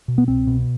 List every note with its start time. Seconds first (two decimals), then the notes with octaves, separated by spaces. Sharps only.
0.08 B2
0.18 B3
0.28 C2 C4
0.47 B2